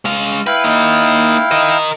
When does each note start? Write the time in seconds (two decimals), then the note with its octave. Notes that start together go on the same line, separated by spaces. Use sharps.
0.05 G#3 F5
0.47 E4 B4 F5 G5
0.64 A#3 D#4
1.51 A#4 D#5